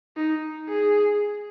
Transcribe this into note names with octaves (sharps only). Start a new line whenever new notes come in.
D#4
G#4